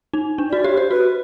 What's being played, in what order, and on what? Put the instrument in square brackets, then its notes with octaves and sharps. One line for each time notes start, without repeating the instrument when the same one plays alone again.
[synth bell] D#4
D4
[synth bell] F#4 [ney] D5
[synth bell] G4 [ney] C#5
[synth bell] G4 [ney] C5
[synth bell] F#4 [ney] B4